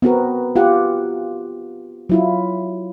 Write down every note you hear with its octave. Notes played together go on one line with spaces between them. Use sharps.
B3 C4 F#4 A#4
F4 G4 F#5
F#3 E4 F4